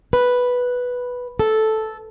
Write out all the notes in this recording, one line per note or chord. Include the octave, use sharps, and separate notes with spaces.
B4
A4